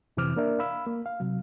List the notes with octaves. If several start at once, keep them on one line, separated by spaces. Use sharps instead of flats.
F2 C3 E3 C4 D6 F6
A#3 D4 A#4 D5 E5
F5 B5 E6
A#3
F5
C3 F#3